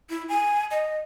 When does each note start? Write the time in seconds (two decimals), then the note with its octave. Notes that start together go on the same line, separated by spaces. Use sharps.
0.10 E4
0.29 G#5
0.71 D#5